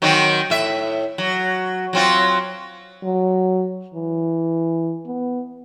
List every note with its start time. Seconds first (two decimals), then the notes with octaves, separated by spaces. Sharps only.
0.02 D#3 F#3 C4
0.50 A2 E5
1.18 F#3
1.93 F#3 C4 F4
3.03 F#3
3.95 E3
5.06 B3